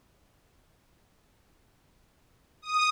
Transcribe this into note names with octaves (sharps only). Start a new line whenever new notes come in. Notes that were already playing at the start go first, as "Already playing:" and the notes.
D#6